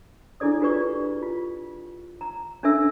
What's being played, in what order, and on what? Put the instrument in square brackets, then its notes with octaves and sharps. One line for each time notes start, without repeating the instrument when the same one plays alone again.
[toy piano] D4 E4 G#4 A4 D5 D#6
F4 G4 G#4 B4 D5 C#6
F4
A#5
C#4 D4 A4 E5 E6